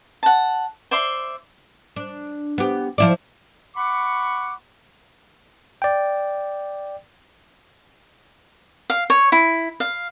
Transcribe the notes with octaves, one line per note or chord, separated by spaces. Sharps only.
F#5 A5
C5 D5 E5 C6
D4
B3 G4
F3 E4 D5
F#5 B5 C#6 D6
D5 G5
F5
C#5
E4
F5